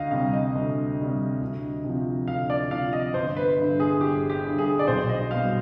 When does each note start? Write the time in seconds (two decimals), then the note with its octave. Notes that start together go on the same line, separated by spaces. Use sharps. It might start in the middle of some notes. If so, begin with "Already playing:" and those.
Already playing: D2 D#5 F5
0.11 C3 G3 F5
0.33 D#5
0.55 D2
0.99 C3 G3
1.42 D2
1.84 C3 F3
2.28 D2 F5
2.50 D5
2.71 C3 F3 F5
2.93 D#5
3.14 G1 C5
3.37 B4
3.58 G2 D3
3.80 G#4
4.00 G1 G4
4.30 G4
4.44 G2 D3
4.58 G#4
4.79 D5
4.87 B1 C5
5.09 D#5
5.31 B2 G3 F5